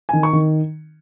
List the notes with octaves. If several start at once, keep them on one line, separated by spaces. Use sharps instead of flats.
D#3 G#5
C#6
D#3